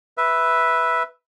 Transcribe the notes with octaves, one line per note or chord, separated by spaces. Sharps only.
B4 E5